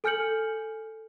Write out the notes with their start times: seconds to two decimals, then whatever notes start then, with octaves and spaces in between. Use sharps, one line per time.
0.04 A4 G#5 F6 G6 C#7 F#7